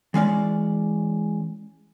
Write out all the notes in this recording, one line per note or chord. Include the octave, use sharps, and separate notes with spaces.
E3 G#3 C#4 D5